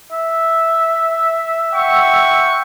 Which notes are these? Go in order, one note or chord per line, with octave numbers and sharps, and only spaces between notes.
E5
F#5 G5 C#6